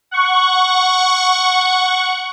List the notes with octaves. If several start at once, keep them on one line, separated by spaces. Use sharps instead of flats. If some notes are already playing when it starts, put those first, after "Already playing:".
F#5 C#6